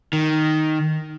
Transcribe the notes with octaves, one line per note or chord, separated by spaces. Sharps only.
D#3